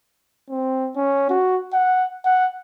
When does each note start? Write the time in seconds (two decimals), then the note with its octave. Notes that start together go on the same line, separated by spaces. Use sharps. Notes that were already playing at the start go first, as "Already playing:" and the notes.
0.50 C4
0.96 C#4
1.29 F#4
1.73 F#5
2.25 F#5